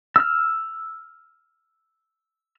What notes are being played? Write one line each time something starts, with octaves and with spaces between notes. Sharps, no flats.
E6 F6